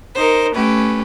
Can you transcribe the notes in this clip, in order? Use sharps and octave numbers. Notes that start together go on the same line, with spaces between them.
D#4 A#4 C5
A3 C#4 G4 B4